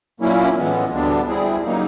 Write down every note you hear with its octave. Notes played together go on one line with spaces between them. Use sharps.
A#2 F#3 A#3 C#4 E4
A2 E3 G#3 B3
D2 D3 G3 B3 D4
G3 C4 E4 G#4
C#3 F#3 A#3 D#4